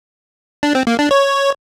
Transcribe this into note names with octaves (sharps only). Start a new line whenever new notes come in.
D4
C4
A#3
D4
C#5